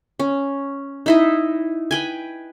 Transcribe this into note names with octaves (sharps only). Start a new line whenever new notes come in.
C#4
D#4 E4 D#5
B4 G5 G#5